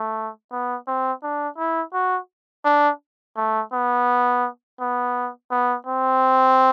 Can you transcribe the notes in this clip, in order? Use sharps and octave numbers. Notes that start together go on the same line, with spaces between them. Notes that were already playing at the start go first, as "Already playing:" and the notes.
Already playing: A3
B3
C4
D4
E4
F#4
D4
A3
B3
B3
B3
C4